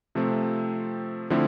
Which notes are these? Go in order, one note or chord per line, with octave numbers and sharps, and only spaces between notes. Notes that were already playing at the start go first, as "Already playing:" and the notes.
C3 F3 A3 C4
D3 F3 A3 C4 E4